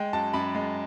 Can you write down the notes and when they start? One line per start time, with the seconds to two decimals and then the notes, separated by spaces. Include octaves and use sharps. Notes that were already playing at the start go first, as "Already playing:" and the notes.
Already playing: G#3 G5
0.13 F#2 A5
0.33 F#2 B5
0.55 G#3